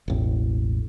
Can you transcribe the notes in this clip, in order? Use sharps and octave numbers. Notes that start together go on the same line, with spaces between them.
E1 A1